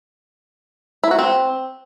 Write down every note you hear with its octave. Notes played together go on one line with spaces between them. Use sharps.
E4
F#4
C4